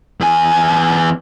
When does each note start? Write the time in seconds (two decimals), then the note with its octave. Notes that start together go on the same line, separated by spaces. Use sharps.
0.20 E2 G#5